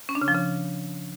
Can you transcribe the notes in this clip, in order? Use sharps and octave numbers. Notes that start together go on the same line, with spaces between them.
C#4
D4
C#3
F3
C#3